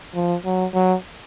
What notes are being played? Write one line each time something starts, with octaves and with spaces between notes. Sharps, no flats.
F3
F#3
F#3